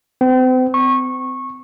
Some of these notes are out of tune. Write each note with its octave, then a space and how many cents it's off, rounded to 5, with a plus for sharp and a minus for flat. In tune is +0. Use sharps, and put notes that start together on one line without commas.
C4 -40
C#6 -20